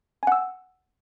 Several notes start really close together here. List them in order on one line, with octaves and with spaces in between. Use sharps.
G#5 F#5 E6